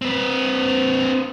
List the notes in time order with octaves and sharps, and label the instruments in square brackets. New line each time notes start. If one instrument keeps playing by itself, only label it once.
[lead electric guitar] C4 B4